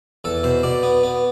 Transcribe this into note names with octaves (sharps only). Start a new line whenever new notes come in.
E2 A4
B2 C5
B2 D5
B3
B3